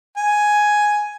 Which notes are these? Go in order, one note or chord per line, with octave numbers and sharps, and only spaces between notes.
G#5